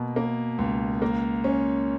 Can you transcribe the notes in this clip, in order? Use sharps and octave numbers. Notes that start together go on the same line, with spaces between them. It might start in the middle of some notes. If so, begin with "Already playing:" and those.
Already playing: B2 A#3
A#3
C#2
A#3
C#4